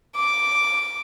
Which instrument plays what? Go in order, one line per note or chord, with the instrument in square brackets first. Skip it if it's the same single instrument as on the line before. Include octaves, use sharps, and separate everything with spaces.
[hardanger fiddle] D6